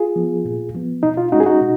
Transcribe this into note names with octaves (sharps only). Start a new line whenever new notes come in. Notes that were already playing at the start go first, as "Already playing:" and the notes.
Already playing: F4 G#4
F3 B3
A#2
F3 B3
B2 D#4
F4
G#3 C#4 D#4 F#4
G#4
D#4 F#4
B2